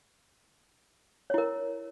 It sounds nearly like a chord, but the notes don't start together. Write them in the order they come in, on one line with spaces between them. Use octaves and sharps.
C#5 E4 A#4